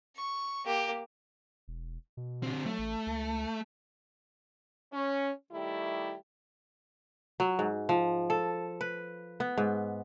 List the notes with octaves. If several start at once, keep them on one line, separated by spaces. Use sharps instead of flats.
C#6
A#3 G4
E1
B2
D3 C4
F#3 A3
A1
C#2
C#4
D#3 G3 A3 E4 G4
F#3
G#2
F3
A4
B4
B3
G#2